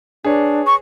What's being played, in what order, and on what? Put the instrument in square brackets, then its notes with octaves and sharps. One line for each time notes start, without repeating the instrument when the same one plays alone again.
[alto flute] D4 [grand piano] G#4 B4 C#5
[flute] C#6